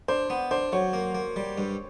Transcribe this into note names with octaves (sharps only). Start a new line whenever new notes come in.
D4 C5
B3
D4 C5
F#3 C#5
A#3
A#3
G3
G2